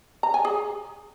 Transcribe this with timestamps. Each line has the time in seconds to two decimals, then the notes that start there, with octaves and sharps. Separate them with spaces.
0.23 A#5
0.34 G#5
0.45 G#4